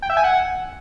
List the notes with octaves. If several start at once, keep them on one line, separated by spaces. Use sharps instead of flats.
G5
E5
G#5
F#5